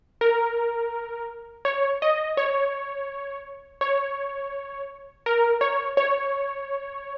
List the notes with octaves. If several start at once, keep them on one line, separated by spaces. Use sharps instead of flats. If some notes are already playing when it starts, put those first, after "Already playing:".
A#4
C#5
D#5
C#5
C#5
A#4
C#5
C#5